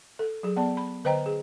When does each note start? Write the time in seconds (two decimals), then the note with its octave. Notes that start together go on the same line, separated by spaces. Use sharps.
0.19 A4
0.43 F#3 G#4
0.57 B3 D5 A5
0.77 B5
1.04 D3 B4 C5 D#5 G5 A#5
1.26 G#4